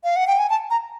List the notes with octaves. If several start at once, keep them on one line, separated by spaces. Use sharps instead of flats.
F5
F#5
G5
G#5
A5
A#5